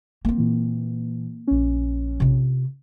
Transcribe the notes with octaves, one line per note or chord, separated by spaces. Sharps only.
A#3 C4
A#2 E3
A#1 C#4
C3 F4